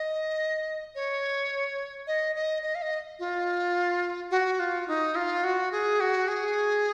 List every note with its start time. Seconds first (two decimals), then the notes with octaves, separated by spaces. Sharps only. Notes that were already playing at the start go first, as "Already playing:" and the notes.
Already playing: D#5
0.95 C#5
2.07 D#5
2.36 D#5
2.63 D#5
2.75 F5
2.82 D#5
3.19 F4
4.31 F#4
4.60 F4
4.88 D#4
5.16 F4
5.44 F#4
5.72 G#4
6.00 F#4
6.28 G#4